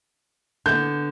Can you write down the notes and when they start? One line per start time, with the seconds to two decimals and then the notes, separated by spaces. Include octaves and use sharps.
0.66 D3 B3 G6